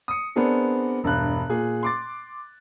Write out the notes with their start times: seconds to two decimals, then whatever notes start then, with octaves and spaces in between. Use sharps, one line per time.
0.08 D#6 C#7
0.36 B3 C4 D4 G#4 A#4
1.04 E1 G2 F#6
1.49 A#2 G#4
1.83 C6 D6 A6